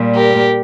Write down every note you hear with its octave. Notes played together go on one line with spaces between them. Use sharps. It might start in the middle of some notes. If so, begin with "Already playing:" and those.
Already playing: A#2 G3
G4 A#4